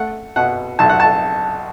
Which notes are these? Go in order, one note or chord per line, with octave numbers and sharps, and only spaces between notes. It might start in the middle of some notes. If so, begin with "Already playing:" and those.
Already playing: A3 F#5
B2 F#5
B1 A5
F#5
A5